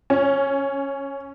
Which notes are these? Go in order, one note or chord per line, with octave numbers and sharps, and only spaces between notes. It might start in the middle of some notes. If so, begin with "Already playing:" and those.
C#4